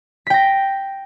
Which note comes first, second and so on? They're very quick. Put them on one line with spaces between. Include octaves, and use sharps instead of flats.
B6 G5 A#6